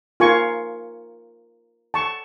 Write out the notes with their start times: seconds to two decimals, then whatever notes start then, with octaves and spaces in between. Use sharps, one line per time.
0.20 F4 A#4 G#5 C#6
1.94 A5 C#6